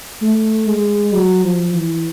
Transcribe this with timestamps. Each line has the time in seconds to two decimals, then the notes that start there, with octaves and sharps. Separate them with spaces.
0.22 A3
0.67 G#3
1.13 F#3
1.44 F3
1.74 E3